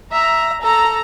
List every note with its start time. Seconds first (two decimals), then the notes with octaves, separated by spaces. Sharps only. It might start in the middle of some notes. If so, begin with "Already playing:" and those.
0.12 E5 A#5
0.63 A4 A#5